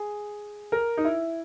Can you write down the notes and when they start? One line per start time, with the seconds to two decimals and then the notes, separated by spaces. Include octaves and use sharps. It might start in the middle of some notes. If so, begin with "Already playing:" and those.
Already playing: G#4
0.72 A#4
0.97 D#4
1.05 E4